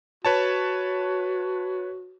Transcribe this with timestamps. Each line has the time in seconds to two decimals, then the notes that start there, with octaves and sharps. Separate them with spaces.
0.25 F#4 B4 C#5 A5